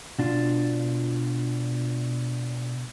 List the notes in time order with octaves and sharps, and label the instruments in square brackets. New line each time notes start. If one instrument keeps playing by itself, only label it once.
[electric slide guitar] B2 D4 F4